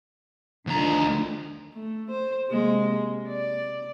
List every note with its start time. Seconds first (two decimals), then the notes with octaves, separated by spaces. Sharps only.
0.67 D2 D3 D#3 F3 A#5
1.74 A3
2.10 C5
2.49 C3 G#3 A#3
3.28 D5